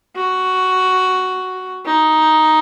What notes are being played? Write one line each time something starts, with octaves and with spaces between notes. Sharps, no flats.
F#4
D#4